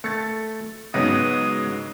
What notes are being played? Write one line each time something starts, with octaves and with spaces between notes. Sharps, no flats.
A3 A6 C#7
G#2 C#3 F#3 B3 D#4 D#6